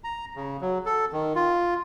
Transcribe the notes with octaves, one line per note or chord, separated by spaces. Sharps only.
A#5
C#3
F#3
A4
D#3
F4